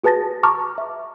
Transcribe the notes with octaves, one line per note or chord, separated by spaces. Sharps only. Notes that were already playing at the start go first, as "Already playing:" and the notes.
F#4 G#4 B4 A5 A6 A#6
A5 A#5 C#6 D6 F6
E5